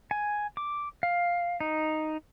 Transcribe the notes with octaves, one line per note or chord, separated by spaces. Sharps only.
G#5
D6
F5
D#4